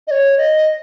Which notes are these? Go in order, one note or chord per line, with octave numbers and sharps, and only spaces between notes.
D#5
C#5
D#5